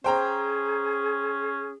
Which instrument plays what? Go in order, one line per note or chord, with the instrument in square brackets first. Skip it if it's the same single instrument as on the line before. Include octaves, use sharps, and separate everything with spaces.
[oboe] C#4 [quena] G#4 [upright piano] C5 G5 A#5